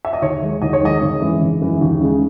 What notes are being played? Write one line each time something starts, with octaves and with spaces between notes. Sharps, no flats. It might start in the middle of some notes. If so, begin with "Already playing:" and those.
E5
D#5
D#2 C#5
D#3 G#3
D#2 D#5
C#5
D#3 G#3 D#5
G#1
F#2 E3 G#3
G#1
F#2 E3 G#3
D#2
C#3 G#3